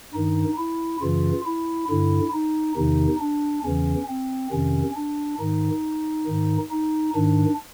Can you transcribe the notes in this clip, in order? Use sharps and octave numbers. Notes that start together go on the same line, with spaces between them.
G2 D#3 D#4
E4
F#2 C#3 E3 F4
E4
G2 D3 E4
D#4
E2 C3 D#3 D#4
D4
E2 C#3 E3 C#4
C4
F2 C3 D#3 C#4
D4
G#2 D#3 D#4
G#2 D#3
D#4
G#2 D#3 D4